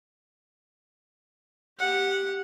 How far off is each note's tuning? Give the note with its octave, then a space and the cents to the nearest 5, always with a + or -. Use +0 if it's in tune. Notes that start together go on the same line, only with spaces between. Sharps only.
G4 +0 F#5 -10